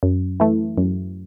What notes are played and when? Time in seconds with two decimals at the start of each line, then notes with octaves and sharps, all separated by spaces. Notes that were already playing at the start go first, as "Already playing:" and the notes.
0.03 F#2
0.40 E3 A3
0.78 F#2